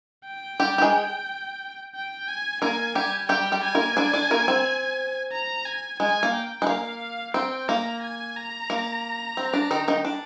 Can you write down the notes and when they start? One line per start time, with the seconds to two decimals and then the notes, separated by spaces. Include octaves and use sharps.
0.26 G5
0.60 G3 G4
0.78 G4
0.82 G#3 G#4
1.95 G5
2.28 G#5
2.62 A#3 A#4 G#5
2.95 G3 G4 G#5
3.29 G3 G4 G5
3.52 G3 G4
3.64 G#5
3.75 A#3 A#4
3.97 D4 D5
4.14 D4 D5
4.31 A#3 A#4
4.48 C4
5.32 A#5
5.65 G#5
6.00 G#3 G#5
6.23 A#3
6.34 G5
6.62 G#3
6.67 A#3 F5
7.34 C4 G5
7.68 A#3 A#5
8.03 G#5
8.36 A#5
8.70 A#3
9.37 C4
9.53 D4
9.71 D#3 D#4
9.88 D#3 D#4
10.05 D4